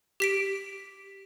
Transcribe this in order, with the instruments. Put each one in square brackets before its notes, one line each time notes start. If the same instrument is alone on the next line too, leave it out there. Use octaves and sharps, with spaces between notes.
[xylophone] G4 B6 D7